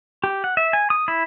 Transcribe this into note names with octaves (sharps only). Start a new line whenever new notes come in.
G4
F#5
E5
G#5
D#6
E4